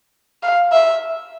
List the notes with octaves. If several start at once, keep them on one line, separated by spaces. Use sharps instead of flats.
F5
E5